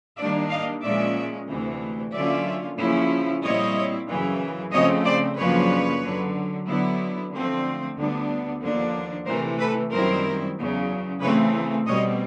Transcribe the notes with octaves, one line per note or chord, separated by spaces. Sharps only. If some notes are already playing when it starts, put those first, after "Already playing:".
D#3 G3 A#3 D4 D5 E5
D#5 F5
A#2 F3 G#3 C#4 D5 E5
D2 C3 E3
D3 F#3 A#3 C#4 F4 D5 E5
C#3 F3 A#3 C#4 E4
A#2 G3 C4 E4 C#5 D#5
F#2 C#3 E3
C#3 F3 A3 C4 C#5 D#5
C5 D5
F#2 C#3 F3 A#3 D4 B4 C#5
F#2 D3 F#3
D3 F#3 B3 E4
D3 F3 A3 C4
D2 D3 G3 B3 D4
D#2 D3 F3 A#3 D4
C3 E3 A3 A#4 C5
A4 B4
F#2 D#3 G3 C4 E4 A#4 C5
E2 C#3 F#3
C#3 E3 A3 C4 B4 C#5
B2 G3 C4 C#5 D#5